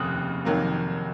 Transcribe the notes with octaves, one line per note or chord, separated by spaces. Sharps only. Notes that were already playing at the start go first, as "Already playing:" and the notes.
Already playing: F1 D#2 C#3 D#6 F#6
F1 F2 D#3 F#3 A#3